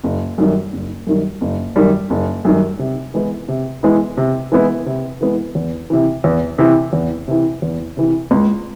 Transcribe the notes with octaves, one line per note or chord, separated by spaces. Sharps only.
F#1
F#2 D#3 G3
F#1
F#2 D#3 G3
F#1
F#2 D#3 G3
F#1
F#2 D#3 G3
C3
E3 G#3 B3 E4
C3
E3 G#3 B3 E4
C3
E3 G#3 B3 E4
C3
E3 G#3 B3 E4
E2
C3 E3
E2
C3 E3
E2
C3 E3
E2
C3 E3
C#2